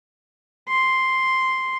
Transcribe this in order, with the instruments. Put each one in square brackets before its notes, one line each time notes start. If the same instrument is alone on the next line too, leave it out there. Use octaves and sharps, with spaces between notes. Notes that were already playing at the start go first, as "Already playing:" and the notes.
[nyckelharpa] C6